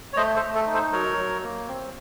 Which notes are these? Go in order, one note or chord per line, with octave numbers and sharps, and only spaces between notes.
C#5
A3 C5 D#5
A4 C5
A3
A4
D#4
A4 C5
F#3 A#4 C#5
F#3
A#3
C4